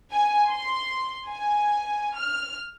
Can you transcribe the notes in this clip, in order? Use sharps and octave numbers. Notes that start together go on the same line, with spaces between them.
G#5
C6
G#5
F6